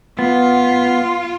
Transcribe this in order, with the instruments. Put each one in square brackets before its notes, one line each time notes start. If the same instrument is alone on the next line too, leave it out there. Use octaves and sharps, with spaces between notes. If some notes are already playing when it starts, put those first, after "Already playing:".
[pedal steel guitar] B3 [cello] F4